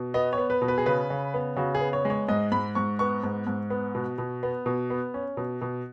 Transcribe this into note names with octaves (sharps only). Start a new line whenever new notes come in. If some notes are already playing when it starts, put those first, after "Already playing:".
Already playing: B2
B3 D#5
C#5
B3
B4
B2
B4
G#4
C#3 B4
C#3
B3
C#3 F#4
G#4
B3
C#5
G#3
C#5
G#2 D#5
G#2 B5
G#2 C#6
B3 C#6
G#2
G#2
B3
B2
B2
B3
B2
B3
C#4
B2
B2